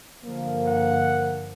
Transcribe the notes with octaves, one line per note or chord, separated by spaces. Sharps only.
G2 D3 F3 A#3
F#5